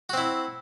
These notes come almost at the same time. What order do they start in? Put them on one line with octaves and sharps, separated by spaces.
F#4 C4 E4